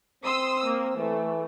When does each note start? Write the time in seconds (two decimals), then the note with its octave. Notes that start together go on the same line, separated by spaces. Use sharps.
0.24 C4 C6 D#6 E6
0.65 A#3
0.97 E3 A3